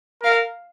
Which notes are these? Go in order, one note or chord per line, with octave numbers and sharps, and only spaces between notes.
A#4 F5